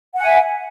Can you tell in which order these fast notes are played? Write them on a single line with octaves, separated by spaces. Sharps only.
F#5 G#5 E5